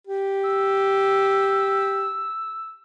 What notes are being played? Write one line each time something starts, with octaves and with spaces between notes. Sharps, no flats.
G4
E6